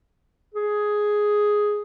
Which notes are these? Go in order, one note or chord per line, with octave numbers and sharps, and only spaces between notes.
G#4